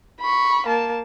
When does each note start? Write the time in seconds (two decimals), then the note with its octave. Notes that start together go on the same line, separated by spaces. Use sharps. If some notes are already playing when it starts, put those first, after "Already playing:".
0.20 B5 C#6
0.67 A#3 A5